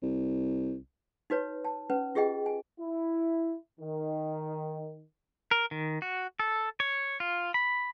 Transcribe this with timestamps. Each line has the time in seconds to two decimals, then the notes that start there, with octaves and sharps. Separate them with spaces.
0.03 C2
1.30 D#4 F#4 B4 C#5
1.65 A5
1.90 C#4 B4
2.15 F4 G4 G#4 D#5 G5
2.46 G#5
2.79 E4
3.80 D#3
5.51 A#4
5.71 D#3
6.02 F#4
6.40 A4
6.80 C#5
7.20 F4
7.54 B5